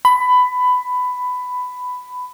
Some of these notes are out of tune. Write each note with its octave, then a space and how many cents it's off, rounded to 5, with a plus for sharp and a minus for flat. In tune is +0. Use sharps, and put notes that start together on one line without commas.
B5 +15